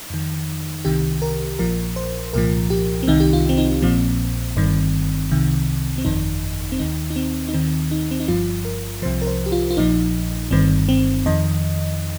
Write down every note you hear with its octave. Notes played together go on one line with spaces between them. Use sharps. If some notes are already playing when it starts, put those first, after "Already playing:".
Already playing: D#4
F2 D#3
C2 C3 D#3 G4
A#4
A#1 A#2 F3 A#4
C5
C2 A#2 F3 A#4
G4
C4
C2 C3 D#3 D#4
G4
F4
C4
D#4
A#1 A#2 F3 C4
G1 G2 D#3
C2 C3 D#3
C4
G1 F2 D#3 D#4
C4
D#2 D#3 D#4
D#4
C4
D#4
D#2 D#3 C4
D#4
C4
D#4
G1 G2 F3 F4
A#4
C2 C3 F3 C5
A#4
C5
G4
F4
F4
A#1 A#2 F3 D#4
G1 G2 D#3 C4
C4
F2 D#3 D#5